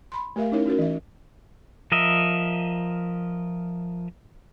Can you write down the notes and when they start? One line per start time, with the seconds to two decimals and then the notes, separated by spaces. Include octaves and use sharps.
0.12 B5 C6
0.36 A3 G4 A#4 E5 F5
0.52 C#4 D#4 E4 A#4 C#5
0.66 C#4 F#4 A#4
0.79 E3 E5
1.92 F3 A#4 D#5 E5